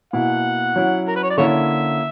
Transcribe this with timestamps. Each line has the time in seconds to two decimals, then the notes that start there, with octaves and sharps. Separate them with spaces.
0.13 B2 A#3 E4 F#5
0.76 F#3 C#4 E4
1.08 A#4
1.16 B4
1.23 C#5
1.30 D5
1.37 D3 A#3 C#4 E4 C#5 E5